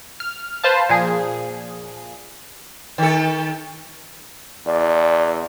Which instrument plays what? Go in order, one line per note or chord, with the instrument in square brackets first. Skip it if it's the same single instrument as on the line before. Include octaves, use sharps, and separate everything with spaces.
[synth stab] F6
B4 C5 F5 A5
A#2 F3 G#4
[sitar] D#3 A4
[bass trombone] E2 [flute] D5